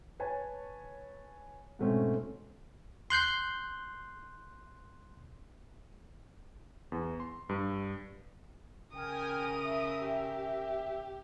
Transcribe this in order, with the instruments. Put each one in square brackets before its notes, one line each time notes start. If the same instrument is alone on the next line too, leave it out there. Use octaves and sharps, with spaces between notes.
[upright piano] B4 C#5 G#5 A5
G#2 B2 A3 C4 C#4
[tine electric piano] C6 F#6 G6 C7
[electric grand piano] E2
C6
G2
[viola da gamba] C#3 A#4 [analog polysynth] G5 G#5 F6 [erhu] D#6
[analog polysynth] E5
[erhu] G4